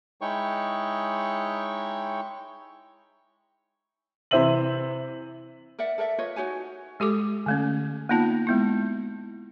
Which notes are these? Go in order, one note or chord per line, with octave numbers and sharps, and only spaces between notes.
G#3 D#4 E4 C#5 G5 C#6
C3 E3 C5 E5 D#7 F#7
A#4 D5 E5 F#5
A4 A#4 D5 E5
F4 B4 C#5 D#5
D#4 F#4 C#5 G#5
G#3 G4 A4 D6
D3 A3 C#4
A#3 B3 D#4 F4 A5
G#3 B3 E4